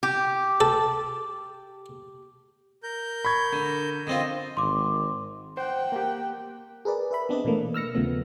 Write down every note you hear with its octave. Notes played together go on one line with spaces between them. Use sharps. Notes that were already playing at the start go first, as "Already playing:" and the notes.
G4
A4
A#4 G6
B5 C#6 G#6
D3
D3 C4 F4 D#5
G#1 C6 D6
C5 F#5 G5
A#3 G4
G#4 A#4 B4 D5
B4 E5 B5
B3 C4 D4 B4 D5 D#5
B2 E3 A3 A#3
E6 F6 A#6 C#7
D#2 C#3 F3 A3 B3